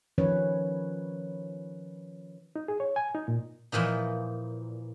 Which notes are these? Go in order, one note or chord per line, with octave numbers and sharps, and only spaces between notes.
D#3 F3 C#4 B4 C#5
D#4
G#4
C#5
G#5
D#4
A#2
A#2 E3 F3 D#4